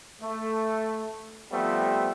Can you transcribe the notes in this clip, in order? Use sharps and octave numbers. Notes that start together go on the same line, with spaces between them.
A3
F3 G3 A3 B3 C4